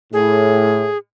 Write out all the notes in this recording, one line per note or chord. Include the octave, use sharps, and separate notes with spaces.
A2 G#4